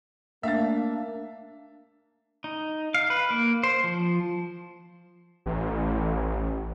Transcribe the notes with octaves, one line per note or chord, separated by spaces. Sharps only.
A3 A#3 D4 E5 F5 A6
D#4
F5
B4
A#3
C5
F3
A1